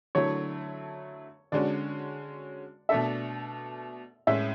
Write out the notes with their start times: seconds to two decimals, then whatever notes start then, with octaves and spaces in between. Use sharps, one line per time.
0.15 D3 F#3 A3 E4 C#5
1.52 D3 G#3 C#4 F#4 D5
2.89 B2 A3 D4 A4 E5
4.27 A2 G#3 C#4 E5